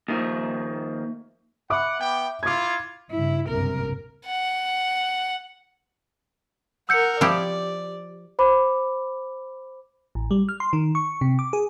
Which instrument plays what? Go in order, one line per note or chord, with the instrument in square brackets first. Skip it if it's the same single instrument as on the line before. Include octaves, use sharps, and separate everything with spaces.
[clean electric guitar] D#2 D#3 F3 [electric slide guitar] A#3 E5
[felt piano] E5 B5 D6 [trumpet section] F#5
[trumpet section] B3 G5
[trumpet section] E4 F4 [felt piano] D6 G#6
[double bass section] G2 C#3 [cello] E4
[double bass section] F#1 B1 G2 [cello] C3 A#4
[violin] F#5
[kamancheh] A#4 F#5 [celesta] E6 G6 C#7
[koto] F3 E4 G4 [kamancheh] D5
[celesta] C5 B5 D6
[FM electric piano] A1
G3
F6
C6
D#3
C#6
C3
D6
G#4